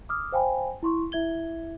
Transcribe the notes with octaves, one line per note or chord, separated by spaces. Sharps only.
D6 D#6 F6
C5 F5 G5 G#5 B5
E4 C6 C#6
E4 E5 G#6 G7